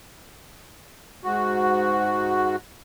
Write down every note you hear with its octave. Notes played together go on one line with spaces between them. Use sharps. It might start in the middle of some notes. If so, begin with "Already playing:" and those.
G#2 F#4